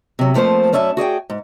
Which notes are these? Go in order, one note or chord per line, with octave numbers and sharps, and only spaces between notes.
C3 F#3
F2 F3 A3 A#3 C5
F#2 C#4 D5 E5 A5
F#4 G#4 D5 G5
G#2